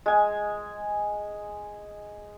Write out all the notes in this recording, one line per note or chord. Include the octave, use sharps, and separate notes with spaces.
G#3 G#5